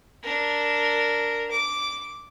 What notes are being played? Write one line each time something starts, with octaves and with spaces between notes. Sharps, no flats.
D4 A#4
D6